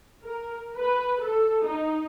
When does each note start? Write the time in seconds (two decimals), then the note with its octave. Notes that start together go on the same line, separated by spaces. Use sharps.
0.24 A#4
0.77 B4
1.20 A4
1.64 D#4